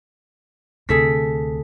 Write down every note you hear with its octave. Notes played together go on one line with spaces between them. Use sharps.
D2 C3 G#4 A4 B6